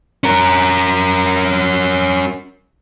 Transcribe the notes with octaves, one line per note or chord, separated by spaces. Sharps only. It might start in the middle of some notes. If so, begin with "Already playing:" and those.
C#4 A#4